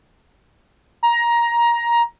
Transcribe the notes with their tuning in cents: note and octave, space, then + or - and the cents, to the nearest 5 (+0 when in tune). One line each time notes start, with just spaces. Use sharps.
A#5 +15